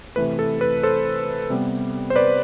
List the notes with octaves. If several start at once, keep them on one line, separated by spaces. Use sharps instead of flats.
C3 E3 A3 B4
A4
B4
A4 C5
C3 G3 B3
C5
B4 D5